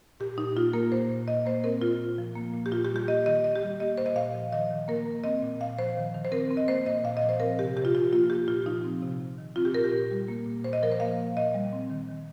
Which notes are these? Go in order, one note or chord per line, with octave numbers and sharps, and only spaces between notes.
A#2 G4
A#2 D#4
A#3 F4
A#3 A#4
A#2 C5
A#2
A#3 D#5
A#3 C5
C4 A#4
A#2 F4
A#2
F3
A#3
A#2
G4
A#2 F4
G4
G3
G4
A#3 D#5
D#3 D#5
D#3 D#5
G4
G3
A#3 D#5
A#2 C5
D#5
A#2 F5
F3
D#3 D#5
D#3
A#3 A#4
A#3
C4 D#5
A#2
A#2 F5
F3 C5
D#3
D#3
C5
C4 A#4
C4
D#5
A#3 C5
A#2 D#5
A#2 F5
D#5
F3
C5
C4 A#4
C3 G4
C3 G4
F4
F3 F4
A#3 F4
A#2 G4
A#2 F4
F3 D#4
C4
C3
C3
D#3
C4 F4
G4
A#2 A#4
G4
A#2
G3
A#3
A#2
A#2 C5
D#5
F3 A#4
C5
A#3 F5
A#2
A#2 D#5
G3
C4
D#3
D#3